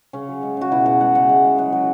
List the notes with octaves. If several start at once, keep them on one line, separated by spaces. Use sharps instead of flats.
C#3 C#4
F#3
G#3
C#3 F#4
B2 E4
B2 F#5
G#3 F#5
C#3 F#5
G#3
G#3
F#3 F#5
F#3